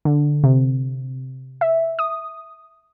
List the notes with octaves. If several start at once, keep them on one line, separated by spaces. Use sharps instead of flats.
D3
C3
E5
D#6